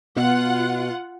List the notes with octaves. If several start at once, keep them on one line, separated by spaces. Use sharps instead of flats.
B2 F4 F#5